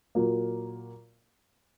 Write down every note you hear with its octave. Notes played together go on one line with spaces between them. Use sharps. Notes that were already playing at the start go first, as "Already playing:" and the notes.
A#2 F#3 A#3